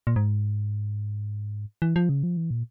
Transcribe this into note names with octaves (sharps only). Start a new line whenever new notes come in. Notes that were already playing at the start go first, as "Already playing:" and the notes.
A#2
G#2
E3
F3
C#3
F3
E3
A#2